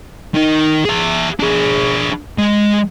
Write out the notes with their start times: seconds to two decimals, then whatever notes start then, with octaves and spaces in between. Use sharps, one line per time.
0.34 D#3 D#4
0.85 G#4 E5
1.40 D4 G#4
2.38 G#3